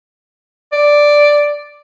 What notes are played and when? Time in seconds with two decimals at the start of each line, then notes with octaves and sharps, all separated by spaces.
0.72 D5